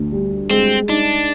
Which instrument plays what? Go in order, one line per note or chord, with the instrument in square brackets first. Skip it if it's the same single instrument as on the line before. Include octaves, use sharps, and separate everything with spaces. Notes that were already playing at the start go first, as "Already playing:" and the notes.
Already playing: [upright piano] D2
G3
[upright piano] G#3 [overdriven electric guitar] C4
[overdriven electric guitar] D4 [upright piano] D#4